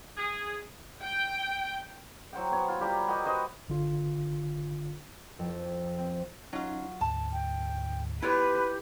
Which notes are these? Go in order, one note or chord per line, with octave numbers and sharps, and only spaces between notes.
G#4
G5
F#3 C5 F#5 G5
B3 C#5
F4
G3 G4 A#4
F#4 G4 A#4 D#5
F#4 B4 C5 D#5
G1 D3 F4
F2
C4
F#3 C#4 D#4 F4
D2 G#2 A5
G5
B3 E4 F4 G4 B4 C#5